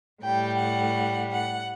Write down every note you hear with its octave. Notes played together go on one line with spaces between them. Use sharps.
A2 G3 G5
F#5
F#5